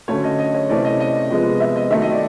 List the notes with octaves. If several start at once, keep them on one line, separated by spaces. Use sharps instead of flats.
D3 F#3 A3 C#4 C#5
D#5
D#5
C#5
C3 E3 A3 C#4 D5
D#5
D#5
C3 F3 G#3 B3
E5
D#5
D#3 F#3 A3 E5
D#5
D5